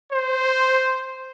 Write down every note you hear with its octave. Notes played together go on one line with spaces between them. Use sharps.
C5